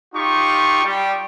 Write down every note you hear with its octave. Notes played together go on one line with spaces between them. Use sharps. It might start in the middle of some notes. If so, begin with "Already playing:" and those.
D#4 F4 G4 C#6
G3